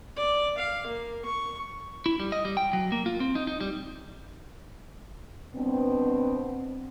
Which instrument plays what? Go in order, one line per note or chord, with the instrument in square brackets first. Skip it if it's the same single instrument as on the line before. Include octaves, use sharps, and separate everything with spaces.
[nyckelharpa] D5
F5
A#3
C#6
[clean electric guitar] E4
G3
D#5
G3
G5
F#3
A#3
F4
C4
D#4
D#4
G3
[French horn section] G2 B2 B3 C4